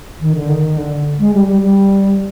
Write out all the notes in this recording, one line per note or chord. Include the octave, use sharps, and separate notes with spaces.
D#3
D3
D#3
D3
G#3
G3
G3
G3